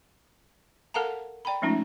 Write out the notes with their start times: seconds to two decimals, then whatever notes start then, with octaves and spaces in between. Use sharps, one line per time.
0.94 A4 A#4 F5 F#5 A5 A#5
1.45 D5 G5 A#5 B5
1.62 F3 G#3 A3 C#4 D#4 F4